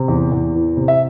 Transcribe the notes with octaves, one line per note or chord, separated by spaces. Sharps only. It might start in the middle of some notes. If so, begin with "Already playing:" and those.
Already playing: C3
E2
E2
E3
C3
E5